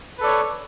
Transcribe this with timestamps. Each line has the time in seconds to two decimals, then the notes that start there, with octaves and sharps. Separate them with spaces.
0.18 B4
0.21 A4
0.23 D5
0.26 C#5